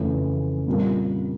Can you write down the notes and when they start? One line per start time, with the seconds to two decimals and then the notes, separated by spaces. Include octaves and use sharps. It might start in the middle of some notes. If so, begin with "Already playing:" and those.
Already playing: F2 C#3 E3 A3 C#4
0.66 A#2 G3 C4 F4 A#4